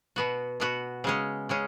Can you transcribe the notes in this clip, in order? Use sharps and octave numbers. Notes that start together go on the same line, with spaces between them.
B2 B3 F#4
B2 B3 F#4
C#3 G#3 C#4
C#3 G#3 C#4